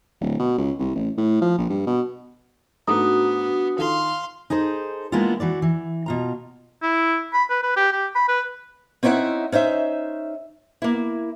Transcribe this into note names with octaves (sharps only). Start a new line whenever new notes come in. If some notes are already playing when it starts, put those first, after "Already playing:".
D1
B2
C#2
C2
A1
A2
F3
A#1
G2
B2
G#2 A3 B3 D4 F#4 A#5 D#6
D#3 F4 A4 F5 C6
D#4 G#4 A4 C5
G#3 A#3 B3 D4 E4 F4
E3 F#4 D5
E3
B2 F4 A#5
E4
B5
B4
B4
G4
G4
B5
B4
C4 C#4 D#4 E4 E5 F#5
C#4 D#4 C5 E5
A#3 E4